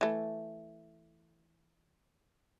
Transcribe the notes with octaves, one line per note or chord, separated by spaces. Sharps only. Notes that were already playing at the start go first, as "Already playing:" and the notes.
E3 A3